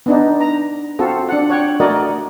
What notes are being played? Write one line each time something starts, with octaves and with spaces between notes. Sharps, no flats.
B3 D4 D#4
A#5
C4 F4 F#4 A4
D4 F#5
C#5 F#5 G5
A3 F#4 A#4 D5 D#5